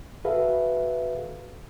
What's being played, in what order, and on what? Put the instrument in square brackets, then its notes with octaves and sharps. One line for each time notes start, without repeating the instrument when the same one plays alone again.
[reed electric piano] F#4 G#4 A4 B4 E5 F5